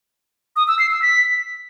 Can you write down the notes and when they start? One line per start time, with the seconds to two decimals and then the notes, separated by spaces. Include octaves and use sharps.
0.56 D#6
0.68 E6
0.79 C7
0.91 E6
1.02 B6